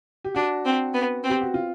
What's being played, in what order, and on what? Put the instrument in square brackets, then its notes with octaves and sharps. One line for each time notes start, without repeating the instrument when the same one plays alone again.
[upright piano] G4
[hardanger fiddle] D4 [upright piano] F#4
[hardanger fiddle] C4
B3
C4
[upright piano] G4
F#4
F4